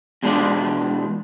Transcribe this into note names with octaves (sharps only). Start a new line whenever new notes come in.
E2 B2 G#3 D4 F4 D5